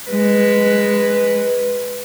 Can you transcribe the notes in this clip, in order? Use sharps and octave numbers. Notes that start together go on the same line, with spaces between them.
G#3 B4